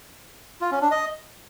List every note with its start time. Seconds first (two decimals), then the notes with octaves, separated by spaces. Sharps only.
0.61 F4
0.71 C#4
0.81 D4
0.91 D#5